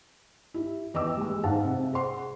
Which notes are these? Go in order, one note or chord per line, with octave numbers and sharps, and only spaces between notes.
E4 G4
E2 D#5 G5 D6 E6
G3 G#3
G#2 F5 F#5 A5
C3
G#4 C5 F#5 C6